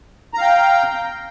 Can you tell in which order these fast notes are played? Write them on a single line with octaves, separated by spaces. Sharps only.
A#5 F5 G5